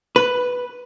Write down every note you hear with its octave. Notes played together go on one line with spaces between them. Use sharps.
B4